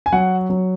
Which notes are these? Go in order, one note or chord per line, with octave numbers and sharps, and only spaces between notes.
G#5
F#3 F#5
F#3